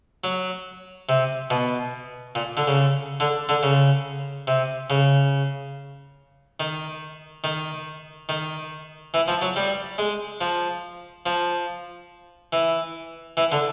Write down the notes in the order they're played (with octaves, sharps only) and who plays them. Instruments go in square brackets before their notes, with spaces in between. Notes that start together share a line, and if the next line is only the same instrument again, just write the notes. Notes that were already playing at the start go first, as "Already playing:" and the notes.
[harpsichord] F#3
C3
B2
A#2
D3
C#3
D3
D3
C#3
C3
C#3
D#3
D#3
D#3
E3
F3
F#3
G3
G#3
F3
F3
E3
E3
D3